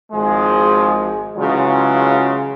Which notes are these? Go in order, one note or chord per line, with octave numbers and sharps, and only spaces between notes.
G#1 F3 G#3
C#3 E3 F#3 G#3 F4